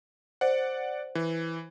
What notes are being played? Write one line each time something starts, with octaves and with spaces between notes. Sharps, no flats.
C5 D5 F#5
E3